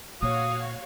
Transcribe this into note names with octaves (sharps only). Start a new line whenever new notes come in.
A#2 A#3 F#4 C#5 F5 D#6